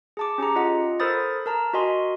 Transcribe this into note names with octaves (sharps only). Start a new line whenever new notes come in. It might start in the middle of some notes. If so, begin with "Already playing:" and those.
G#4 A5 D6
C#4 G4 G#4 A#5
F4 D#5 F#5
A4 A#4 C5 B5 D#6 A6
A#4 A5 A#5
F#4 A#4 D#5 G#5 C6